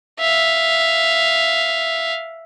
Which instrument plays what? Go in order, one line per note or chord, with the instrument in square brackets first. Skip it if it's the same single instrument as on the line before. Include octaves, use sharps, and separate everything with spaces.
[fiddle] E5 F5